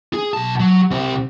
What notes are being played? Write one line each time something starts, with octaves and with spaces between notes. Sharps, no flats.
G#4
B1 A5
F#3
C2 C4